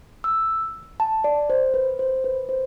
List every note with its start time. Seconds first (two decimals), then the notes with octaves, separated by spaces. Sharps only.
0.24 E6
1.00 A5
1.24 D5
1.50 C5
1.74 B4
1.99 C5
2.24 B4
2.49 C5